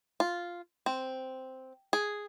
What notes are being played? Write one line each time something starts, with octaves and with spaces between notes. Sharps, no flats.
F4
C4
G#4